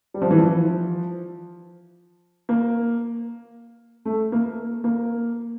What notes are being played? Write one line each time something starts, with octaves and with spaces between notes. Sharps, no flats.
G3
F3
E3
F3
A#3
A3
A#3
A#3